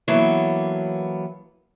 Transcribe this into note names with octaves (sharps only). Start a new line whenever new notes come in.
E3 F#3 A#3 B3 A4 C#5